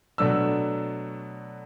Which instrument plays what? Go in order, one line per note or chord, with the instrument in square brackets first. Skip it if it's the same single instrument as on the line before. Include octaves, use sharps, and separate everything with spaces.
[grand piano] B2 F#3 A3 D4 E6